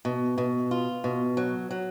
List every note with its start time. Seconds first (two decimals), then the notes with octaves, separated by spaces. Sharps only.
0.05 B2
0.38 B2
0.71 F4
1.04 B2
1.37 F#3
1.71 F#3